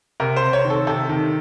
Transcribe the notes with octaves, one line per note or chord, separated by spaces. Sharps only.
C3 A#4
C5
C3
C#5
D#3
A4
C3 A4
D#3